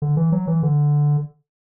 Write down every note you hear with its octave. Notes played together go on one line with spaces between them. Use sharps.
D3
E3
F#3
E3
D3